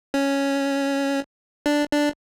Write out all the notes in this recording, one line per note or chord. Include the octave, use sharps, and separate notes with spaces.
C#4
D4
D4